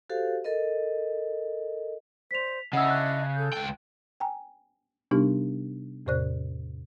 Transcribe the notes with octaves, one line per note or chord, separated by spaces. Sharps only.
F#4 G4 A4 C5 F5
A4 A#4 D#5
C5 D5 B6 F7
C#3 D4 E4 D#5 F#5 E6
F#6
A4 G6
C#2 G5
G5 G#5 A#5
C3 G3 B3 D4 D#4 G4
E2 A2 C3 C5 D5 F#6